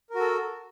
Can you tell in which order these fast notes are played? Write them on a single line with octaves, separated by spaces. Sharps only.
A#4 F#4 A4